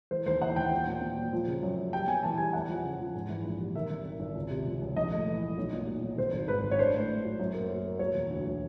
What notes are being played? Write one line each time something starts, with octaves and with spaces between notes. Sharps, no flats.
E3 C5
D#2 C5
E3 F#5
D#2 G5
A#2
A#2
A#2
F#3
F3
C#3
F#2
F#2
G3 G5
B3 G#5
E3 A5
G3 G#5
E2 F#5
F3
C#3
F3
G#2
E3
A#1
G3
D#3 E5
G#1
D#3
G#1
C#2
C3
F3
C#2
A#1 D#5
A3
E3
A3
B1
A#2
F#3
B1
G#1 C5
G#1
G#2 B4
G#1
C#5
D4 C5
A2
A2
F#3
F#2
A#3
F#3
A#3
F#3 C#5
E1
D2
F#3